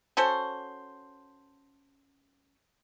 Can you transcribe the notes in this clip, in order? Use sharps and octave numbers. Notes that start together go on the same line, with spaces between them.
C#4 F#4 A4 C5